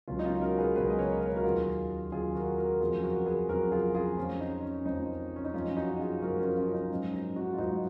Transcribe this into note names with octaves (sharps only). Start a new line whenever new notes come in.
C#2 B2 F#3 C#4 F4
D#4
C#4 F4
F#4 A#4
G#4 B4
C#2 B2 F#3 G#4 B4
D#5
A#4 C#5
A#4
B4
F#4 A#4
D#2 D#3 F#3 F4 G#4
D#2 D#3 F#3 F4 G#4
F#4 A#4
F#4 A#4
F2 C#3 F#3 F4 G#4
F#4 A#4
G#4 B4
F2 C#3 F#3 F#4 A#4
F4 G#4
F4 G#4
F2 F3 C#4
D#4
C#4
F2 F3 D#4
C#4
D#4
F#2 F3 C#4 F4
D#4 F#4
F4 G#4
F#2 F3 F#4 A#4
C#4 F4
C#4 F4
C#4
D#4
G#2 F#3 C#4
D#4
D#4 F#4
F4
G#2 F#3 D#4 F#4